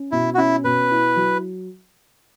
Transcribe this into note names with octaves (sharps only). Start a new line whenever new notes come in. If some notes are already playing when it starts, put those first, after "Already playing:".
Already playing: C#4
B2 E4
F#4
C#4 E4
B2 B4
E4
F#3